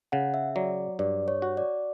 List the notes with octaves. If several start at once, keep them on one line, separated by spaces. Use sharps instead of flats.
C#3 F#5
E5
F#3 D5
G2 D5
C#5
F#4
D5